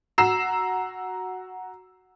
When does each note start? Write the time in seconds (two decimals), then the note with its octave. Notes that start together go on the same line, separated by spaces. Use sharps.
0.18 F#4 A#5 E6 C7 E7